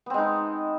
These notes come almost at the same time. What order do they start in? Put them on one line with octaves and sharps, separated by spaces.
B3 C4 G#3 D#4